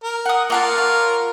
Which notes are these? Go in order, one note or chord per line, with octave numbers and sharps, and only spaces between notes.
A#4
F#5 D#6
A#3 F4 A#4 F#5 A5
C#5